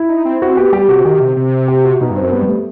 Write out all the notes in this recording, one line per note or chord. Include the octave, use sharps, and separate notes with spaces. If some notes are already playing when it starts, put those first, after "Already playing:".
Already playing: E4
D#4
C4
C4 F#4
B3 G4
G3 G4
C3 F#4
D#3 G4
C3
C3
G4
F#4
B2 D#4
G2
C4
F#2
G2 B3
G3
A3